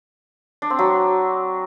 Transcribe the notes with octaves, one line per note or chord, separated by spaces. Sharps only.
D4
C4
F#3